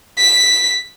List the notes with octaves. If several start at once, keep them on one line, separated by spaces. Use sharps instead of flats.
B6